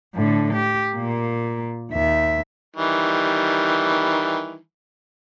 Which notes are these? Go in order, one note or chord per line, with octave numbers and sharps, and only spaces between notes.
A2 D3
G4
A#2 A#3
D#2 E5
D#3 E3 G3